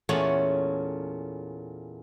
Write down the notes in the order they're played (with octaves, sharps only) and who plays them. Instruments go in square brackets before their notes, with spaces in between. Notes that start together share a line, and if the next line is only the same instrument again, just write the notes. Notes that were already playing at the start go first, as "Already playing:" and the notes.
[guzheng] E2 A#2 A3 C#4 C#5 F#5